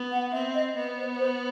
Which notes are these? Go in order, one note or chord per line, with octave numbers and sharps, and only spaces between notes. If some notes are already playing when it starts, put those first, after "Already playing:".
Already playing: B3
F#5
C4 E5
D#5
B3 D#5
C5
C5